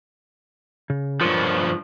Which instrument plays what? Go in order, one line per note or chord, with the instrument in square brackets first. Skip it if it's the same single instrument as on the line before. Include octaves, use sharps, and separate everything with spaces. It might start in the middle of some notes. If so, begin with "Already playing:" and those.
[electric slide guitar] C#3
[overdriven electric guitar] G2 F3 [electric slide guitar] F4 A#4 C#5